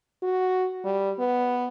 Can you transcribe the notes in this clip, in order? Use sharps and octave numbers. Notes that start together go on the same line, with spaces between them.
F#4
G3
B3